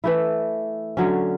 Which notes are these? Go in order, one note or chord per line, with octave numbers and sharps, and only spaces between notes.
E3 A3 E4
D3 F#3 C#4